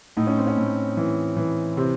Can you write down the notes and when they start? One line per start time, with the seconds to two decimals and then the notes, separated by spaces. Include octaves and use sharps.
0.17 A2 D#4
0.27 C#4
0.38 C4
0.47 C#4
0.57 A2
0.97 E3
1.37 E3
1.77 C3 C4